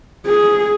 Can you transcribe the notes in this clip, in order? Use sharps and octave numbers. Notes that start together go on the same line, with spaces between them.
G#4